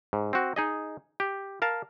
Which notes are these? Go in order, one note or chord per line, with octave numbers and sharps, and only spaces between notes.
G#2
C4 F#4
D#4 G#4 D#5
G4
A#4 F5 A5